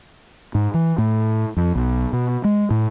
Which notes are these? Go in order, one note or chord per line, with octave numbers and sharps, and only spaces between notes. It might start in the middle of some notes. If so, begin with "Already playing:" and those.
G#2
E3
A2
F2
B1
B2
G#3
A2